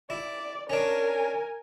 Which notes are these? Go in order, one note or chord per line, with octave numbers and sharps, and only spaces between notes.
E4 D5
C#4 D4 A#4 G#5